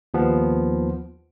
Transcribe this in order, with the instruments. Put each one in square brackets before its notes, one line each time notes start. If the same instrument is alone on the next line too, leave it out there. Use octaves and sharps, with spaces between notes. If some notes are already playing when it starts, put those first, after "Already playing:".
[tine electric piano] D#2 F3 B3